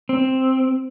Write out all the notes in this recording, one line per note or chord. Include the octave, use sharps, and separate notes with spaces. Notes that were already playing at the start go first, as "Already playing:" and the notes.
C4